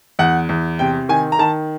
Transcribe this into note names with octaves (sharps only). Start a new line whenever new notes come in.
E2 F#5
E2
C3 G5
D#3 G#5
A#5
D#3 A5